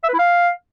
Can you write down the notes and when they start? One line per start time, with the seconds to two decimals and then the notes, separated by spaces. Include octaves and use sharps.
0.03 E5
0.08 B4
0.14 E4
0.19 F5